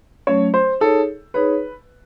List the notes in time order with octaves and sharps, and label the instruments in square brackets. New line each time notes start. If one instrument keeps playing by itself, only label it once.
[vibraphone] F#3 A3 C#4 [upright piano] C#5
[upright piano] C5
[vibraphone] D#4 G#4 C#5 [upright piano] A4
[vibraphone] D#4 G#4 C#5 [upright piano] B4